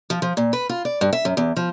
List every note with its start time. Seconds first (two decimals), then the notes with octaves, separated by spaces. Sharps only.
0.10 F3
0.22 F3
0.37 A#2
0.53 B4
0.69 F4
0.85 D5
1.01 G2
1.13 E5
1.25 F#2
1.37 E2
1.56 F3